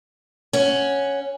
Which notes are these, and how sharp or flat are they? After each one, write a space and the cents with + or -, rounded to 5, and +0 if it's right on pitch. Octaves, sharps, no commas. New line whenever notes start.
C#4 +0 F#5 +0